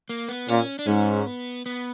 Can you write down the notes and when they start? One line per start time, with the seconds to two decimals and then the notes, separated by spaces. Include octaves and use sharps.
0.09 A#3
0.29 B3
0.48 A#2 C#4
0.79 D4
0.87 G#2 C#4
1.26 B3
1.66 B3